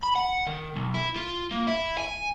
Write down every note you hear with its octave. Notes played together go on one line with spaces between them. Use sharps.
B5
F#5
D#3
B1
E4
F4
A#3
E4
G#5